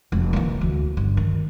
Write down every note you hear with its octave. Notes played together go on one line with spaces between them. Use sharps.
F1
E3 A#3
D2
G1
D#3